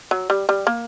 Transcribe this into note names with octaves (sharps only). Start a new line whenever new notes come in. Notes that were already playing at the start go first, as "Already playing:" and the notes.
F#3
G3
G3
A#3